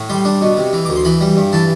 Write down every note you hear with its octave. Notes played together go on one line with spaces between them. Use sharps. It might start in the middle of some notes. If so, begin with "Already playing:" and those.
Already playing: A2
G3 C6
D4
B2
C3
E3
D2 D6
C6
E3 B5
G3
G2
E3 A5